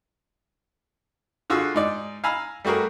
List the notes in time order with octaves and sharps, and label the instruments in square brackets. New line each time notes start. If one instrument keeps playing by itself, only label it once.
[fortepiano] D3 F4 F#4 G#4 E6
G#2 D#4 D5
F5 G#5 A#5 B5 E6 F6
G3 A3 F#4 G#4 A#4